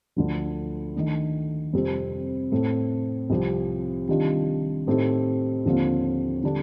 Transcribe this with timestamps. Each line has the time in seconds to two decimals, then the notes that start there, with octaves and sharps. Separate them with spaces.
0.16 D2 D3 F3
0.96 D#3 A3 D4
1.73 F2 C3 G3 C4
2.52 A2 A3 C4
3.30 C2 C3 F3 C4 G4
4.08 C3 D#3 G3 D4 F4
4.87 A2 A3 C4 D#4 G4
5.65 D#2 D3 F3 C4 F4
6.44 D3 G3 D4